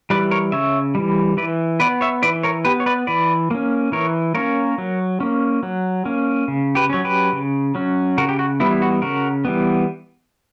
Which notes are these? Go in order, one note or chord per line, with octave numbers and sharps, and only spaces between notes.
E3 G3 B4 D5
A#4 C#5
C#3 C#5 E5
E3 G3
E3 B4 D5
B3 B4 D5
C#5 E5
E3 B4 D5
A#4 C#5
B3 G4 B4
C#5
B4 D5
E3 B4 D5
A#3 C#4
E3 A#4 C#5
A#3 C#4 A#4 C#5
F#3
A#3 C#4
F#3
A#3 C#4
C#3
G4 B4
F#3 C#4 C#5
G4 B4
C#3
F#3 C#4
C#3 F#4 A#4
G4
F#4
E3 G3 B3 E4
E4
F#4
C#3 F#4 A#4
E3 G3 B3